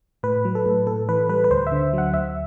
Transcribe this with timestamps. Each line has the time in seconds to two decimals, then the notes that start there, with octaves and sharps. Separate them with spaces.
0.23 A2 B4
0.45 F#3
0.55 A4
0.66 A2
0.87 A2 A4
1.09 E3 B4
1.29 G3 B4
1.44 B4
1.51 D2 C5
1.67 E5
1.72 D3
1.93 F#3 F#5
2.14 D2 E5